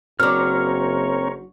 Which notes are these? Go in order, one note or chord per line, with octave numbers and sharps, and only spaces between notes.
F#1 F#3 C4 D4 A#4 C#5 F6